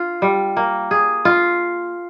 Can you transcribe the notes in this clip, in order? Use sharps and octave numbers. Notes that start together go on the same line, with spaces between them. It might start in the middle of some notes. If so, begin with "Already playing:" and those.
Already playing: F4
G3
A#3
G#4
F4